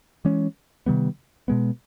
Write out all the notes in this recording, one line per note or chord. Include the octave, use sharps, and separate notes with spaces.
E3 G#3 C#4
C3 D#3 G3 B3
B2 G#3 B3